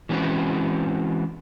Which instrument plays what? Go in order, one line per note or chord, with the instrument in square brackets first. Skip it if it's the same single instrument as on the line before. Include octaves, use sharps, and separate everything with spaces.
[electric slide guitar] E3 G#3 C4 C#4 F#4 B4